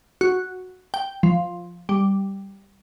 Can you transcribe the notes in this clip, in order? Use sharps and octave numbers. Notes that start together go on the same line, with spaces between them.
F#4
G5
F3
G3